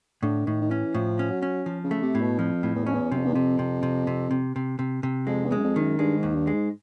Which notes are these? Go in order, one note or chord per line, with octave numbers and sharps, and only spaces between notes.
A2 D3
A2 D#3
D#3
E3 C#4
A2 F3
C#4
F#3
C#4
F3
C#3
A3
C3
A2
B2
F2 F3
A2
E2
F2 C#4
E2
F#2 C3
F2
E2
F2 C3
C3
C3
C3
C3
C3
C3
C3
F2 G#3
E2
F#2 G#3
F2
D#3
F#2
G2 G#3
G#2
D#2
G2
G#3
G#2